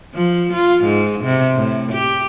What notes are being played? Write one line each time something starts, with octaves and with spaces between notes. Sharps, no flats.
F3
F4
G#2
C3
A2
G4